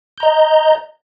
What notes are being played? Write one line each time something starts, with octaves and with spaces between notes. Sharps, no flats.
D#5 A#5 G6